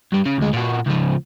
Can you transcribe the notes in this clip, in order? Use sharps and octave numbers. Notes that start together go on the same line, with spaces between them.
G2 G3
C#3
D2 G#3
A#2 F#4
C#2 F3